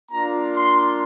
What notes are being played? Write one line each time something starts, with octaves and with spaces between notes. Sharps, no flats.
A#3 D4 F4 A#5
C6